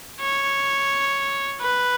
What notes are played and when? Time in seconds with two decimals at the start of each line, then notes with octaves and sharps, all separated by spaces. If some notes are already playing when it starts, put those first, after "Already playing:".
0.21 C#5
1.62 B4